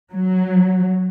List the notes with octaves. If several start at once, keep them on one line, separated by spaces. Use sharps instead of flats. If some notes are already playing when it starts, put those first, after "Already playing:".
F#3